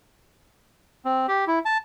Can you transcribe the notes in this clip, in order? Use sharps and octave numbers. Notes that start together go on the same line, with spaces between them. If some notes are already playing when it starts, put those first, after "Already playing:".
C4
G4
E4
A5